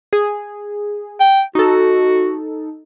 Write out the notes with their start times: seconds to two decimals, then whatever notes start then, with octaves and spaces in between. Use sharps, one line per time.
0.13 G#4
1.20 G5
1.55 D#4 F#4 A4